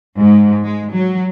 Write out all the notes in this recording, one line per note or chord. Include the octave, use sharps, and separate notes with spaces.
G#2
G#3
F#3